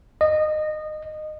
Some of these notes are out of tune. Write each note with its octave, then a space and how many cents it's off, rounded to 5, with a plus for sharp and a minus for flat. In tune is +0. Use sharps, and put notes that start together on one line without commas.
D#5 -20